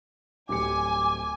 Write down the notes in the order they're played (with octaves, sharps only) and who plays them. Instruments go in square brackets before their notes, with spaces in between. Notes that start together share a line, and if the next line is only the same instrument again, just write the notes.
[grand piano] D1 G3 C#7 [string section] G#5 [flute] D6